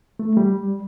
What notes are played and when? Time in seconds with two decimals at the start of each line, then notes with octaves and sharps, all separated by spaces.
0.19 A3
0.37 G3